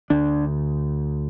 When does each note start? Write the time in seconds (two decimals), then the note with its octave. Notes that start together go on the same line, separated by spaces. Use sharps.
0.10 D2 D3 D4